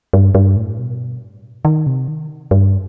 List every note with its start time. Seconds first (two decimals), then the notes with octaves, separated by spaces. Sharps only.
0.13 G2
0.35 G2
0.57 A2
0.79 B2
1.65 D#3
1.86 C3
2.08 D#3
2.51 G2